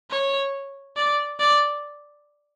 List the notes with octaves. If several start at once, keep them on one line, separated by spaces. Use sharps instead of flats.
C#5
D5
D5